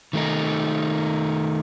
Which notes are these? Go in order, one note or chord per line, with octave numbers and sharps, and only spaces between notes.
D#3 A3 D#4